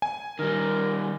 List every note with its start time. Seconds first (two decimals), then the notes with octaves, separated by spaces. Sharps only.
0.02 G#5
0.39 D#3 G3 A#4